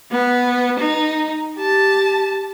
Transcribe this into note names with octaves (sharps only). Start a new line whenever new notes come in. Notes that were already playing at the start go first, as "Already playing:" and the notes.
B3
D#4
G4 A5